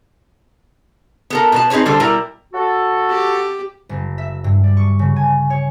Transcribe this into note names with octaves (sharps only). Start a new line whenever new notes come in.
B3 A4 A#4
B2 B4 A5
C4 D#4 G#4 B4 C#5
D3 G3 A3 A4 C5
B2 G3 E4 A#4
F#4 A4
G4
F#1
E5
G2
D5
C#6
C#3
G#5
C#5